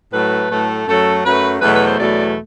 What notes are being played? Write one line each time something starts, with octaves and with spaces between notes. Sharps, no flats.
A2 F#3 A3 B4
A2 F#3 A3
F#2 F#3 A3 A4
F#2 F#3 A3 B4
E2 B2 F#3 A3 B4
B4
C5
E2 B2 F#3 A3 D5